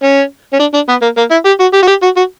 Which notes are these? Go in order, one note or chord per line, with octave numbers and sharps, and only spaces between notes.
C#4
C#4
D4
D4
B3
A#3
A#3
E4
G4
F#4
G4
F#4
G4
F#4
F#4